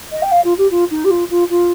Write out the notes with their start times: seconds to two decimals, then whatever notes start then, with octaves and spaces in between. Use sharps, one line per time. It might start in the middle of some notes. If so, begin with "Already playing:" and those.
0.11 D#5
0.22 G5
0.31 F5
0.44 F4
0.57 G4
0.70 F4
0.90 D#4
1.04 G4
1.10 F4
1.30 F4
1.49 F4